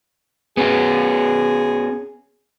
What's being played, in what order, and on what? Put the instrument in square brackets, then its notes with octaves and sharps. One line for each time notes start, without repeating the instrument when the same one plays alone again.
[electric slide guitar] B3 C#4 F#4 [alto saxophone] G#4